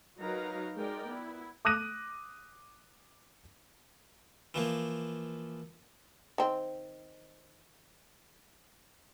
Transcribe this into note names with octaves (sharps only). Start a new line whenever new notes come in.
F#3 D#4 A#4 B4 F5 A#5
G#3 D#4 A#4 D5 G5
B3 E4
D6 D#6 F#6 A#6 D#7
E3 F3 A#3
D#3 C4